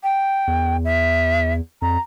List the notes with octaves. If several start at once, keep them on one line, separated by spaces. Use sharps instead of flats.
G5
E2
E5
F2 A#5